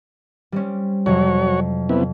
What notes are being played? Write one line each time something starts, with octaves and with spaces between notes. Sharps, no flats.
G3 C4 C#4
F2 C3 F#3 F#4 C#5
C3 B3 E4